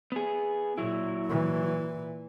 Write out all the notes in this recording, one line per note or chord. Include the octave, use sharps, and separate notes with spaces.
B3 G#4
A#2 F#3 E4
A#2 E3